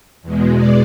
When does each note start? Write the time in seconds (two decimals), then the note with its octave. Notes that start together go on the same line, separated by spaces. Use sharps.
0.22 E2 B2 G#3
0.54 D5